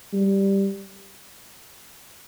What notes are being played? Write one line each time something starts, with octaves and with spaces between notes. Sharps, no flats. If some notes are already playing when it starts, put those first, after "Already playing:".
G3